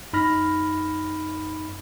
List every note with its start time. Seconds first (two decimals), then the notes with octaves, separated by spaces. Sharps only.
0.13 F#2 D#4 B5 F6 A#6